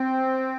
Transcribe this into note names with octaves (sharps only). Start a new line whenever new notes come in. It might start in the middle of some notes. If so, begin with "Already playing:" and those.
Already playing: C4